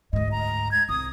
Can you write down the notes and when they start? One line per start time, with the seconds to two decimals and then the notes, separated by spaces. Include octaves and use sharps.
0.13 D2 G#2 D#5
0.32 A#5
0.72 G#6
0.89 C2 D#6